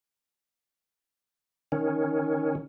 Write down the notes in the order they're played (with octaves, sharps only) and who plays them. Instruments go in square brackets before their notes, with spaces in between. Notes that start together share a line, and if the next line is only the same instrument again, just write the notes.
[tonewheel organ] D#3 C#4